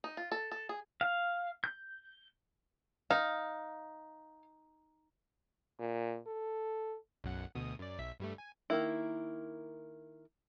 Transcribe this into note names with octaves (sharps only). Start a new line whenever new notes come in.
D#4
F4
A4
A4
G#4
F5
G6
D#4 F5
A#2
A4
B1 F#2 F#5
D2 B2 D#6
F#2 D5
B1 E5 B6
G2 G3 A3
G#5
D#3 A#3 E4